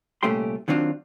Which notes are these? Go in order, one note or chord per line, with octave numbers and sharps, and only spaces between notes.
C2 A#2 A3 C#4 G4 C6
D#3 F#3 C4 D4 F4